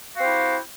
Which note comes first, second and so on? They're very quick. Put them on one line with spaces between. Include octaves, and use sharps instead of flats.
F#4 F5 C4 G4 E4